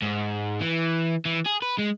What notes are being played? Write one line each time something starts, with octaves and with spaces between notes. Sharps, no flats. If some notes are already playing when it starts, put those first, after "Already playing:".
G#2
E3
E3
G#4
B4
G#3